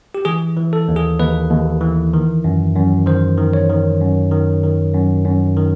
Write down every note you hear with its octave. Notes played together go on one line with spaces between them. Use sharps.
G4
E3 G#4
E3
A4
D#2
G#4
D#2 B4
D#2
E3
D#3
F#2
F#2
D#3 C5
D#3
C#5
D#3
F#2
D#3
D#3
F#2
F#2
D#3